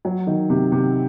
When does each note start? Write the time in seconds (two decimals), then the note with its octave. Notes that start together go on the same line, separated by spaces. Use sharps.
0.05 F#3
0.27 D#3
0.50 C3
0.72 C3